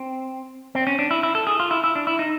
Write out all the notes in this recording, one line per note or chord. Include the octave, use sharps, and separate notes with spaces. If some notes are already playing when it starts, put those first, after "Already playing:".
Already playing: C4
C4
C#4
D4
E4
E4
A4
G#4
F4
E4
E4
D4
E4
D#4